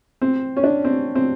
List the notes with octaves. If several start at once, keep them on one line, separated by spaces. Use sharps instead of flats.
C4
C#4
D4
C4
C4